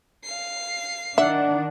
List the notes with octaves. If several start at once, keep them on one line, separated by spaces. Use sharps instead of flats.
F5 C7
D#3 D4 E5 F#5